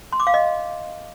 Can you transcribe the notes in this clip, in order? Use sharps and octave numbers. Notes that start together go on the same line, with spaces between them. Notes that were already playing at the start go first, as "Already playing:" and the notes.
C6
D6
F5
D#5